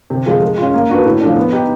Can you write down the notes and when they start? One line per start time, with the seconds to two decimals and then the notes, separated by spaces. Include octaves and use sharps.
0.10 C3
0.26 F3 G#3
0.42 G#3
0.58 C#4 F4
0.74 A#3
0.89 D4 F#4 B4
1.05 A2
1.21 F3 A3 D4
1.36 B3
1.52 D#4 G4